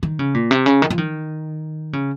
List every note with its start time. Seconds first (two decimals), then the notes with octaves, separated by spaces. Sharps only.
0.03 D#3
0.19 C#3
0.34 A#2
0.51 C3
0.66 C#3
0.82 D#3
0.90 F3
0.98 D#3
1.93 C#3